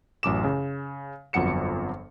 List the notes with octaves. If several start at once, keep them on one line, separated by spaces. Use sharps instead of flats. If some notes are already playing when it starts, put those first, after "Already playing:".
A1 F#2 D6 E7
C#3
G1 F2 F#3 F#5 C#7 E7